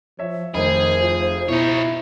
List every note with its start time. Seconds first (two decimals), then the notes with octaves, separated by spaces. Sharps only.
0.19 F3 C#5 E5
0.54 F1 D#3 A3 G#4 C5
1.00 F4
1.48 B2 D#4 E4 C#5